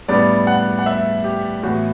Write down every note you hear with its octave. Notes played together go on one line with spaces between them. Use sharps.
A2 G3 B3 D4 D5
F#5
F#5
E5
G4
A2 E3 B3 F#4